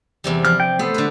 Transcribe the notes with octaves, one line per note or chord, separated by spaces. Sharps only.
E2 C3 G3
F3 F6
G5
A3 B3 A4 C5
D3 B4